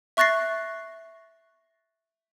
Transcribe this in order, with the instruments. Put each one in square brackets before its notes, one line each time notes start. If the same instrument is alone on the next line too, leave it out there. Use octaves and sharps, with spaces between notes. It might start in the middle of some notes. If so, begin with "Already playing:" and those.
[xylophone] E5 C#6 F#6 A6 A#6 C7